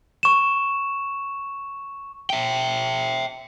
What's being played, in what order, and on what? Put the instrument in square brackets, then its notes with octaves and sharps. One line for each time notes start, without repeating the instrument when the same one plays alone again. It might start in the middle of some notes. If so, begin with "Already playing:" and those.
[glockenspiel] C#6 E7
[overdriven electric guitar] E5 G5